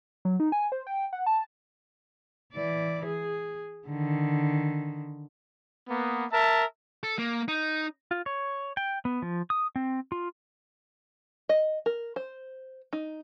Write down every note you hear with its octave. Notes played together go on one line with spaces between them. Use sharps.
F#3
D#4
G#5
C5
G5
F#5
A5
E3 D5
G#4
D3 D#3
A#3 B3
A#4 E5 A5
A4
A#3
D#4
F4
C#5
G5
B3
F3
D#6
C4
F4
D#5
A#4
C5
D#4